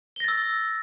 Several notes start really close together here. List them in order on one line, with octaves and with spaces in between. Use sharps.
G7 A#6 A6 E6